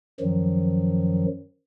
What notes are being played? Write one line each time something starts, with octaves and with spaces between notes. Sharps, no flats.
F#2 D#3 F3 F#3